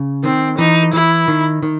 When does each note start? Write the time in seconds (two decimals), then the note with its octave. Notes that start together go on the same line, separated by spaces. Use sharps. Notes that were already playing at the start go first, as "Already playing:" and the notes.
Already playing: C#3
0.24 D#3 C4
0.58 E3 D#4
0.93 E3 E4
1.28 D#3
1.63 D#3